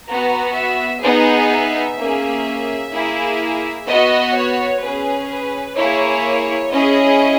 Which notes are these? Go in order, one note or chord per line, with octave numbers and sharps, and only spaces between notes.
B3 F#4 A#5
E5
B3 D#4 G#4
E5
A#3 C#4 G#4
A#3 E4 G#4
B3 F#4 D#5
C#5
C#4 G#4 B4
B4
A#3 E4 G#4 C#5
C#4 E4 G#4 D#5